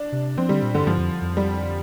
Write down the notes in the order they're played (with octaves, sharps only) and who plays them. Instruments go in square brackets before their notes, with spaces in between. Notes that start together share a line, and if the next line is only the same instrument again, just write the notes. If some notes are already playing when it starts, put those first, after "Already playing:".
Already playing: [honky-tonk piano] D4
[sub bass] C3
[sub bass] F3 [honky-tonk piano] C4
[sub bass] D3 [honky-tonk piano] G3
[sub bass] A#2
[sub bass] G2 [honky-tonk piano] D3
[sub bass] G2 [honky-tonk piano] F3
[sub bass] F2
F2
[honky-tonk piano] G3